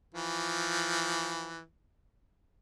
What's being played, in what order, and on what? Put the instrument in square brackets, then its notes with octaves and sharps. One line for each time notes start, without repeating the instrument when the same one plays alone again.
[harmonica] E3 F3